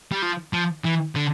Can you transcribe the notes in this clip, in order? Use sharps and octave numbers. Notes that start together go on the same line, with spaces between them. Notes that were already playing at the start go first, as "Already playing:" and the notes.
G3
F3
F3
E3
D3